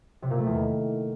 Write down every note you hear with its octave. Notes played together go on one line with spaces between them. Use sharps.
C3
A#2
A3
E2
D#3